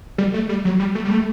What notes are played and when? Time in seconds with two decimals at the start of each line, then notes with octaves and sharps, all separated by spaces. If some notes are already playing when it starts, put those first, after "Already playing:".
0.18 G3
0.34 A3
0.49 G3
0.65 F#3
0.79 G3
0.95 A3
1.05 G3
1.11 A3